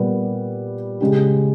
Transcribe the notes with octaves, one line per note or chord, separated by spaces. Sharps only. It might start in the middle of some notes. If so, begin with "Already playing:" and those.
Already playing: A#2 G3 B3
C#3 G#3 C#4 G4